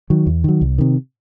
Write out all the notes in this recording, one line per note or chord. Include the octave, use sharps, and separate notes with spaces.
D#3 F#3
E2
D#3 F#3
C2
C3 D#3